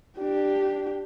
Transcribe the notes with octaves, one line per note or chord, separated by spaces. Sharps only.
D4 G4